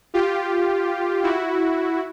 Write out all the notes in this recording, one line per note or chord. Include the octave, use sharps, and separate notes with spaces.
F4 G4
E4 F#4